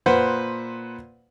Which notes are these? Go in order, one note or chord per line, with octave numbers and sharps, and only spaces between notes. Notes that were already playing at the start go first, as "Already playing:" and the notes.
A#2 B4 C5 F#5